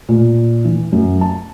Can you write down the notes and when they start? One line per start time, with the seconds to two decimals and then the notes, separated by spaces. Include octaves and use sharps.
0.09 A#2
0.65 E3
0.92 F#2
1.21 A5